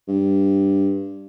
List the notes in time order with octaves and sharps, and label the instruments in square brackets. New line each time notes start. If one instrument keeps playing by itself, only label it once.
[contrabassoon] G2